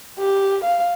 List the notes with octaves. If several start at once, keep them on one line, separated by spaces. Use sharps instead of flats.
G4
F5